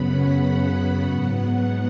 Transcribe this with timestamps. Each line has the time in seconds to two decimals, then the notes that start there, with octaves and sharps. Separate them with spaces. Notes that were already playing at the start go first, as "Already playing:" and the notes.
Already playing: F#2 C#3 F#3 B3 F#5 B5
1.02 G#2 F#3 B3